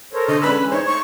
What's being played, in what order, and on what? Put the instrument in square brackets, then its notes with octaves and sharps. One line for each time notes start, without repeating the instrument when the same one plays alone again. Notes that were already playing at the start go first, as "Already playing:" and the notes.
[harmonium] A4 C5 C#5 [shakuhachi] A#4
[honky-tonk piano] D3 [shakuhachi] D#5
[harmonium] D3 G#3 D4 [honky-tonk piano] C#4 B4 E6 [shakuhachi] B5
[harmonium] E3 G#3
[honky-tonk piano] D#4 C5 [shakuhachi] C#5
[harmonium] A3 [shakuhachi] C#6